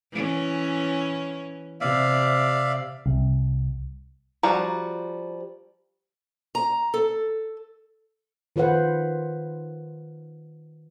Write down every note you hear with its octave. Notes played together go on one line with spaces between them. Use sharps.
E3 C#4
C3 D5 E5 F5
C2
F3 G3 F#4 A#5
A#5
A4
D#3 F4 B4 C5 F#5